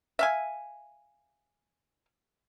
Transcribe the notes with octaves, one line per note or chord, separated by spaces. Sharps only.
E5 F5 G#5